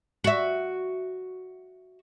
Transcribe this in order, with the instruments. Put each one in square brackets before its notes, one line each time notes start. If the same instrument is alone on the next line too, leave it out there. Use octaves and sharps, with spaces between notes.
[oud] F#4 E5